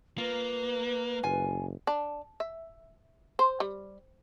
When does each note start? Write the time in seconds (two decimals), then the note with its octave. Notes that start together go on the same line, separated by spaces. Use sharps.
0.18 A#3 F4 B4
1.23 F#1 F4 G#5
1.87 D4
2.40 E5
3.39 C5
3.60 G3